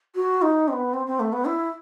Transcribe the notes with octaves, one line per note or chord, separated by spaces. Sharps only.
F#4
D#4
C4
B3
C4
C4
A3
B3
E4